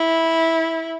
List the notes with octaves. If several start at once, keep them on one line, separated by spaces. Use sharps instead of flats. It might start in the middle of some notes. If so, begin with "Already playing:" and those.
Already playing: E4